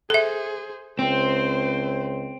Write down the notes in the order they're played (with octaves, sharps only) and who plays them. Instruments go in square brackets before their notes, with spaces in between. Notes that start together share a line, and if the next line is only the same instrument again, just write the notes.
[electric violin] G#4 C5 [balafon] A4 E5
[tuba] C#2 [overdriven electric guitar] C4 [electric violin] C5